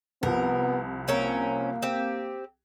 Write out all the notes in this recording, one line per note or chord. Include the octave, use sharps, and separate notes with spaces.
C2 F3 B3 A#4
A#3 C4 C#4 A#4
C4 G4